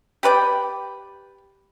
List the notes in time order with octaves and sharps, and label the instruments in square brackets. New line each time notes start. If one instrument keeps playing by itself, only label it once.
[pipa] G4 B4 D5 G5